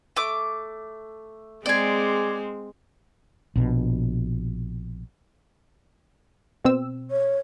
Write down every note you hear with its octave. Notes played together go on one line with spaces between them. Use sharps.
A3 D6
G#3 C4 G#4 D5
A#1 B2
B2 C4 E6
C#5